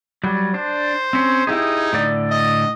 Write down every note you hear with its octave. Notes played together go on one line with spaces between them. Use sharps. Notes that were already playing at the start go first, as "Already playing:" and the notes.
F#3 G3
D4 C5
C4 C#4
D#4 E4 G4 G#4
A2 D3 D5
D#5